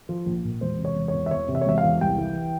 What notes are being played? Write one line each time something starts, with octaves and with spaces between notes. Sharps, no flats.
F3
A#1
A#2
E1 C5
C3
C#5
E1
E2 C#5
E5
E1 C#5
C3
E5
C#5
E1 E5
F5
E2
C2 G5
E3